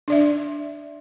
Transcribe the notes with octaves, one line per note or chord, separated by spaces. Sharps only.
D4 D5 E5